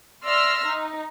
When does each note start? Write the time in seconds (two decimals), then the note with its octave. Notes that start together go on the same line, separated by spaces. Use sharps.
0.24 D5 E5 C6 E6 F6 A#6
0.65 D#4